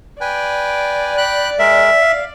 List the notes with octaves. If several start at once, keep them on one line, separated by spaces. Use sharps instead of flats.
B4 D5 G5 G#5
G5 B5 F#6
G#3 A#4 E5
F5